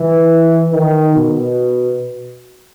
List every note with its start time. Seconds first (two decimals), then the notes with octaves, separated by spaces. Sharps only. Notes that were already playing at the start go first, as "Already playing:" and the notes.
Already playing: E3
0.71 D#3
1.15 B2